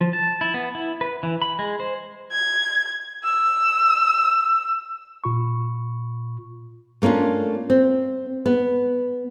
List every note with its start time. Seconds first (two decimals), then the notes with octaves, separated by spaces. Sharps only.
0.01 F3
0.13 A5
0.41 E4
0.54 B3
0.75 E4
1.01 B4
1.23 E3
1.42 B5
1.59 G#3
1.80 C5
2.32 G#6
3.24 E6
5.24 A#2 F4 B5 C#6
7.02 A3 A#3 C#4 D4 F4
7.70 C4
8.46 B3